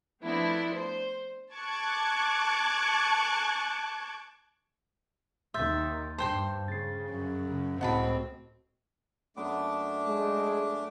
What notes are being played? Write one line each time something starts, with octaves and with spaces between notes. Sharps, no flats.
F3 A3 B3 C4 D4 E4
C5
A5 C#6 D6 F#6 G#6
D#2 D#3 E5 C6 G6 A6
G2 C5 G5 A5 C6
C#3 A6 C7
F#2
C#3
C#2 A2 C4 F#4 D#5 F#5 A5 B5
F#2 A3 B3 D4 D6
G#3